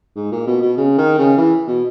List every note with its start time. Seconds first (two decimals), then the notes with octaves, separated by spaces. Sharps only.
0.16 G#2
0.32 A#2
0.47 B2
0.62 B2
0.77 C#3
0.98 D#3
1.18 C#3
1.38 E3
1.67 B2